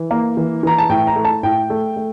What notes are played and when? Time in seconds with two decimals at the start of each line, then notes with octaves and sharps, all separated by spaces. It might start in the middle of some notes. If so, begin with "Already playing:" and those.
Already playing: E3
0.11 A#3
0.37 E3
0.63 E3 A#5
0.78 A5
0.89 A2 G5
1.07 A#5
1.16 A3
1.25 A5
1.43 A2 G5
1.70 A3
1.96 A3